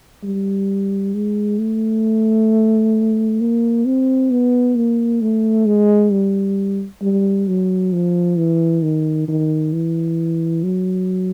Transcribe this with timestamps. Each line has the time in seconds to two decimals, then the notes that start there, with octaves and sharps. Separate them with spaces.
0.23 G3
1.14 G#3
1.59 A3
3.41 A#3
3.85 C4
4.31 B3
4.76 A#3
5.22 A3
5.66 G#3
6.12 G3
7.02 G3
7.48 F#3
7.93 F3
8.38 E3
8.83 D#3
9.28 D#3
9.73 E3
10.64 F#3